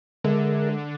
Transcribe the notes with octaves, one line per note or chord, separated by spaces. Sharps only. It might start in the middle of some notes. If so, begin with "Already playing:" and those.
D3 G#3 G#4 A#4 E5